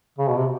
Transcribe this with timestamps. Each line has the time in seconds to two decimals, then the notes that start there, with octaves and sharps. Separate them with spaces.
0.18 C#3
0.29 B2
0.37 C3